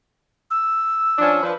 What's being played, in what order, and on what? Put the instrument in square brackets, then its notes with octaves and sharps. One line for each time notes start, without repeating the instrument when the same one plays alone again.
[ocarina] E6
[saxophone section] F3 C#4 D4
F3 D4 B4